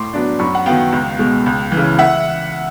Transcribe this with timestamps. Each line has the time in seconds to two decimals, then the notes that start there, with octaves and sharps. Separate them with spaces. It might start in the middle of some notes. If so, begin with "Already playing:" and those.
Already playing: A2 C6 D6
0.13 F#3 B3 D4
0.39 F#2 B5 C#6
0.55 F#5
0.66 D#3 F#3 B3 F5 G5
0.93 C#2
1.19 B2 G#3
1.46 C#2
1.72 E3
1.77 C#3
1.99 E5 F#5